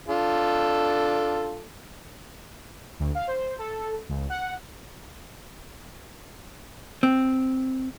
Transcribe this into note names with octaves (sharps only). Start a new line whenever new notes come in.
D4 F4 A4
D2
F5
C5
A4
C#2
F#5
C4